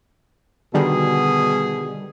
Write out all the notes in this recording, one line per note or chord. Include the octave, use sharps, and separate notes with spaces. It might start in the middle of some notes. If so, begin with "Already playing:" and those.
B2 D3 D#3 G3 F#4 G#4